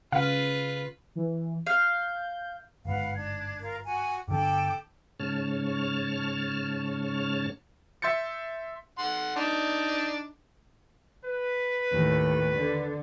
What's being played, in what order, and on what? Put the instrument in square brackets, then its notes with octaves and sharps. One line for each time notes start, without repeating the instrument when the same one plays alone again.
[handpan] C#3 [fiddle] F4 B4 [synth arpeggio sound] F5
[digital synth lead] E3
[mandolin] F5 [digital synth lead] G6
[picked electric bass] G1 G#2 [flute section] B4 F5 F#5
[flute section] D4 G#6
F4 A#4
F#4 G#5
[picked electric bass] G2 D3 D4 [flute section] A4 G5 D6
[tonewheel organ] G#2 C#3 C#5 A5 F6
[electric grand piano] E5 C6 G6 A6 C#7
[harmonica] F#5 C6
D4 D#4
[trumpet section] B4
[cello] D#2 A2
D3